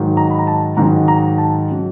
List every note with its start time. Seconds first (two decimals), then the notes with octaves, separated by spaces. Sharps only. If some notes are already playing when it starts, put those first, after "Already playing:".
Already playing: G#2 D#3 F#3
0.17 A#5
0.30 B5
0.39 A#5
0.47 A5
0.77 G#2 D#3 F#3 A#5
1.08 A#5
1.38 A5
1.70 C#3 F#3